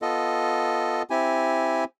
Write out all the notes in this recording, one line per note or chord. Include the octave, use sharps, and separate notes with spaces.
B3 F4 A4 D#5
C4 E4 G4 G#5